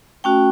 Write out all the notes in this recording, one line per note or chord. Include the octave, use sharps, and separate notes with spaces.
A3 C#4 F#4 G5